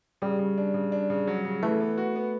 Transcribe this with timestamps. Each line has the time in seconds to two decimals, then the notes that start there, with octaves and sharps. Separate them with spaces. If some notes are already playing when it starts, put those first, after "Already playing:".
0.22 C#3 G3
0.39 C#3
0.58 D4
0.74 C#3
0.92 D4
1.10 C#3
1.27 F#3
1.45 C#3
1.63 E3 A3
1.80 B3
1.98 F#4
2.16 B3